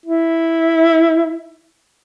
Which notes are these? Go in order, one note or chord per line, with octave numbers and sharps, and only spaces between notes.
E4